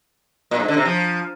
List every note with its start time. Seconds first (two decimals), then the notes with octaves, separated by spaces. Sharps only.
0.51 A#2
0.60 G#2
0.68 D3
0.77 C3
0.85 F3